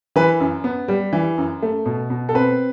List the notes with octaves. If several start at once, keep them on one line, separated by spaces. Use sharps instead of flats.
E3 B4
F#2
B3
G3
E3
F#2
A3
B2
B2
A4
C4 B4